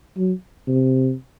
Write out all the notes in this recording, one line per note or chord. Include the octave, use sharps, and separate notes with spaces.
F#3
C3